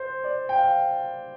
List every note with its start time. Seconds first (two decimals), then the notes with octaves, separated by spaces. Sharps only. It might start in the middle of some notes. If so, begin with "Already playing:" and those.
Already playing: C5
0.24 D5
0.49 G5
0.55 F5